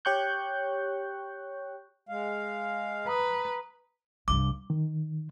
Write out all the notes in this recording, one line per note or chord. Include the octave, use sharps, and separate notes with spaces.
G4 C#5 G5 C#6 F#6 G6
G#3 F5
B4 A#5 D#6
C2 G2 D6
D#3